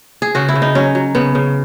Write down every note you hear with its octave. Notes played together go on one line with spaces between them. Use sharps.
G#4
C#3 F#4
E4
C#3
D#4
F#3 C#4
F#3
C#3 B3
C#3